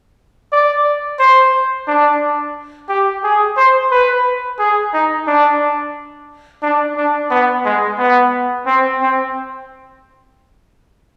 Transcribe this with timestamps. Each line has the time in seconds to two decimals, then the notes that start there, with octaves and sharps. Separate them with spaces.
0.52 D5
1.19 C5
1.88 D4
2.89 G4
3.24 G#4
3.57 C5
3.91 B4
4.59 G#4
4.93 D#4
5.27 D4
6.62 D4
6.97 D4
7.31 B3
7.65 G#3
7.98 B3
8.66 C4
9.01 C4